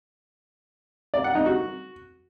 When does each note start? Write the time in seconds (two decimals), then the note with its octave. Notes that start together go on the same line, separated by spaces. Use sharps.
1.14 D5
1.24 F#5
1.35 D#4
1.46 F#4